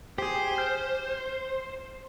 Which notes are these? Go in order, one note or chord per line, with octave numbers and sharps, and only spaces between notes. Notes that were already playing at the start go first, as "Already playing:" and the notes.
G4 G#4 C5
F6 G6